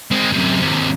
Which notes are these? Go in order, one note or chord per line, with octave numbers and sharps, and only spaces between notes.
G#3 C4
F#2 C3
D#2 C3